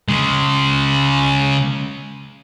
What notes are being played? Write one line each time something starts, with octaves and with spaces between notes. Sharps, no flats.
C#3 G#3